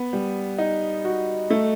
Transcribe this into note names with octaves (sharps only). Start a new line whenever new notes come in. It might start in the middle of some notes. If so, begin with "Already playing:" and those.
Already playing: B3
G3
D#4
F#4
A3